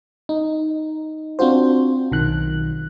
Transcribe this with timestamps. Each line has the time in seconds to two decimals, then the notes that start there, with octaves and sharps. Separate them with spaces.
0.29 D#4
1.39 C4 D4 F4 F#4 C5
2.11 B1 D#3 F#6